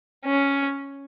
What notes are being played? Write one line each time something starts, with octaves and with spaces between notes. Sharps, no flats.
C#4